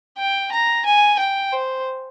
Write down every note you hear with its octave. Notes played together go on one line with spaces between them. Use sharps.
G5
A#5
G#5
G5
C5